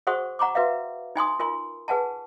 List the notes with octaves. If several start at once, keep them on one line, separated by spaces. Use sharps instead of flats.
F#4 G#4 C5 F#5 C#6 D#6
F#5 A#5 C#6 D6
F#4 B4 E5 F5
D#4 G#5 C6 D#6
F4 A#4 G#5 C6
G#4 B4 F#5 G#5 A5